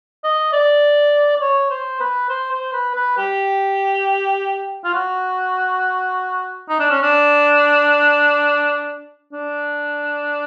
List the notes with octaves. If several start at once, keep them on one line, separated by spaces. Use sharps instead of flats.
D#5
D5
D5
C#5
C5
B4
C5
C5
B4
B4
G4
F4
F#4
D#4
D4
C#4
D4
D4